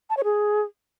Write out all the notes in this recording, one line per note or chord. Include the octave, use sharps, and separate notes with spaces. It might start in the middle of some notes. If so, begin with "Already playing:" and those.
A5
C#5
G#4